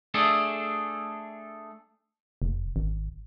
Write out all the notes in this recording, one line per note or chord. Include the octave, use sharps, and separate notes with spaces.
A3 D4 G#4 A4
F1
G#1